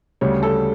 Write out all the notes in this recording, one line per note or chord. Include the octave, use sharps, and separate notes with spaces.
D2 C#3 G3 C#5
A4